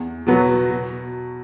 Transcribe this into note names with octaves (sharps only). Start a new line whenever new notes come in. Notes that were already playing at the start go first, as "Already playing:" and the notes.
Already playing: E2
B2 F#3 B3
B2